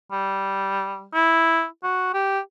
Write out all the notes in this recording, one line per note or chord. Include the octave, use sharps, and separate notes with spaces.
G3
E4
F#4
G4